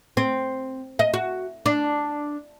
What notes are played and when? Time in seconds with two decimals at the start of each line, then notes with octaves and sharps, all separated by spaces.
0.17 C4
0.99 D#5
1.14 F#4
1.66 D4